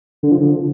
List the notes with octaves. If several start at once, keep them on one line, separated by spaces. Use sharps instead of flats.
D3
F3
D3